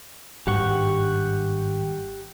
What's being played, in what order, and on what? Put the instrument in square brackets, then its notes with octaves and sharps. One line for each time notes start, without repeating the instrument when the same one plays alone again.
[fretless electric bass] G#1 G2 [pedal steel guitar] G4 F#5 C#6